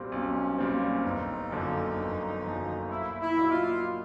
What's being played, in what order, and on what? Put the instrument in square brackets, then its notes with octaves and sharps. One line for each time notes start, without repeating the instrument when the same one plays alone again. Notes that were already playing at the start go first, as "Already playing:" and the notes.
Already playing: [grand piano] B1 A#2 G3 C4
[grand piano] B1 [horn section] C#4
[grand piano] A#2 G3 C4
[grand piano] G1 [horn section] D#4
[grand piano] F#2 D3 F3 A#3
G1
F#2 D3 F3 A#3
[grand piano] A#1 [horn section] E4
[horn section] E4
[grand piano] A#2 F#3 A#3 D#4
[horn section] F4